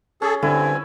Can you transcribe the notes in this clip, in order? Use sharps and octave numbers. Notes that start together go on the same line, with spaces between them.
C#4 G#4 A4
G2 D3 C4 E4 G#5